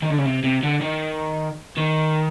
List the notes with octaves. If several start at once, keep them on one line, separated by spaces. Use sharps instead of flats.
D#3
D3
C#3
C3
C3
D3
D#3
D#3